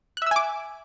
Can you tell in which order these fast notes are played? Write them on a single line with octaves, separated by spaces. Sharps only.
F#6 E5 E6 G#5 D6